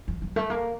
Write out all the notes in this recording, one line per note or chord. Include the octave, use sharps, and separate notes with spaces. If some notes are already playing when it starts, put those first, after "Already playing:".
F3
F#3
A3
A#3